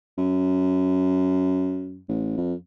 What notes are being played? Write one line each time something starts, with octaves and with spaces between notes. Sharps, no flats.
F#2
A1
F2